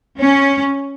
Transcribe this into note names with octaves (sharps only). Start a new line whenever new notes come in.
C#4